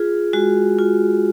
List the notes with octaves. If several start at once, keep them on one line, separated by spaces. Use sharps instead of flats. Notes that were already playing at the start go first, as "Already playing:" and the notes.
Already playing: F4 G#4
G#3 F#4
F4